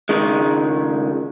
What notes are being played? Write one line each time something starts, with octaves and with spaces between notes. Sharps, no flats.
C#2 G#2 D#3 G#3